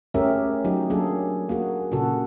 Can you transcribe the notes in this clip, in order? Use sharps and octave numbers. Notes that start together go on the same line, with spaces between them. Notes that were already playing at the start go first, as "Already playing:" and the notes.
A3 C#4 G4 G#4 A#4 E5
F#3 D#4 G4
F#3 A#3 D4 G#4 A4
A#3 F#4 G#4
A#2 C#3 F#4 A4